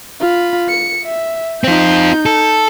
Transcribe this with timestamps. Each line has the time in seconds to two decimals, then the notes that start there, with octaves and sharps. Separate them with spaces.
0.20 F4 B5
0.69 C#7
1.04 E5
1.64 C4 D#4 F4 G6
2.26 A4